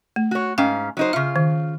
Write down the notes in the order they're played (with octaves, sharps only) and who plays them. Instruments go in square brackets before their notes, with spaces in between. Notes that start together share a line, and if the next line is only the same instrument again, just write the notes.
[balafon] A3
[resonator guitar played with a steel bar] F#4 C#5
[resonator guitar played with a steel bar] G#2 C#4 F5 [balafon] G5
[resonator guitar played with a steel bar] F#3 D#4 C5
[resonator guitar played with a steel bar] C#3 F4 [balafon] E5
[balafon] D#3